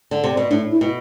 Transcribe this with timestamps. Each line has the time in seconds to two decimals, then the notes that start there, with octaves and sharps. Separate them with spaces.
0.11 D3
0.24 C3
0.37 B2
0.50 A2 D4
0.71 E4
0.81 B2